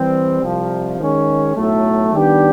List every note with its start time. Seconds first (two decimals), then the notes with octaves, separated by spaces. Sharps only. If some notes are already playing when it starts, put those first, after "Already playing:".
Already playing: E3 G3 C4
0.42 C2 C3 F3
0.99 D#3 G#3 C#4
1.55 B1 A2 F#3 A3
2.13 D#3 G3 B3 D4 G4